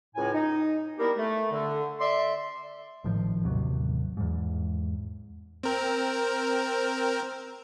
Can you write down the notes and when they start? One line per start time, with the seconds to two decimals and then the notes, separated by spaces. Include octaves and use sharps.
0.15 C#2 A2 G#5
0.32 D#4
0.98 G3 A#3 B3 E4 G4 A#4
1.17 A3
1.51 D3
2.00 D5 E5 C6
3.04 G#1 A2 D#3 F3
3.44 A1 D#2 C3 F#3
4.17 E2 G#2
5.63 C4 A#4